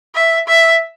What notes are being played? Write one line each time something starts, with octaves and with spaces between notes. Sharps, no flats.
E5
E5